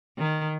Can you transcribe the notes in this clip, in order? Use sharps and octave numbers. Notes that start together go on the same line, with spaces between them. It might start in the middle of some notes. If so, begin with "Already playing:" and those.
D#3